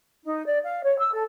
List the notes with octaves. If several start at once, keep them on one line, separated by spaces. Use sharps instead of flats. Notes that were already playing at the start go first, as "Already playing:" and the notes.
D#4
D5
F5
C#5
E6
A4